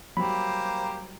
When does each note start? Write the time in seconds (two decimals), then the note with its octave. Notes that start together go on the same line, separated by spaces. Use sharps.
0.17 F#3 G3 A#3 G4 C5 B5